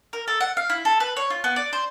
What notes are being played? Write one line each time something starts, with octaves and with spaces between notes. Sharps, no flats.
A#4
A4
F#5
F5
E4
A4
B4
C#5
F4
B3
D5
C5